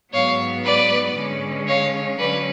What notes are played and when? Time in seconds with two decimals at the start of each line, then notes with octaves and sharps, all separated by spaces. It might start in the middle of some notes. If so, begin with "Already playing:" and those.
0.13 G#2 F#3 B3 C#5 F5
0.64 B4 D5
1.16 D3 G#3 C#4
1.67 C#5 F5
2.18 D3 F#3 C#4 B4 D5